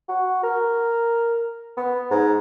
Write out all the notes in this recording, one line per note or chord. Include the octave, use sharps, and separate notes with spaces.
F#4
A#4
B3
G#2